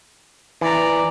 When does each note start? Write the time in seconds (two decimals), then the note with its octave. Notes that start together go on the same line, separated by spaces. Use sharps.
0.61 E3 D5 A#5